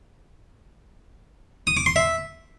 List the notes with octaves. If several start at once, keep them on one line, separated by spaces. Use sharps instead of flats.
D#6
D6
C6
E5